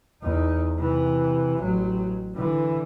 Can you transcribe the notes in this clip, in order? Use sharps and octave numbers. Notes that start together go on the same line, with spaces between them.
E2 D#4
C3 E3
A1 F#3
D3 E3